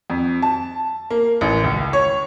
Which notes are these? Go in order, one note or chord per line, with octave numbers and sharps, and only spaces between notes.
F2
A5
A#3
A1
C#2
C#5